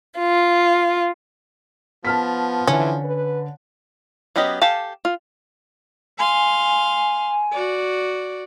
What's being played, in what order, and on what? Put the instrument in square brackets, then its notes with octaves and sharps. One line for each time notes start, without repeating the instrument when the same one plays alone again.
[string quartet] F4
[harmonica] F3 [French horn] B3 [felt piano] A5 F6 B6
[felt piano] D3 [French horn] E3 [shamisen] C#4
[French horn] B4
[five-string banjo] F#3 B3 C#4 G4 D#5
G4 A4 F5 G#5 A5
F4
[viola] F5 C6 [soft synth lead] G#5
[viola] F#4 D5